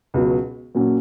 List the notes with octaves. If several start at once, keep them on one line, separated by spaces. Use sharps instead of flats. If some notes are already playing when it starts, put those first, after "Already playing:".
C#2 B2 F#3
A#2 F#3 C#4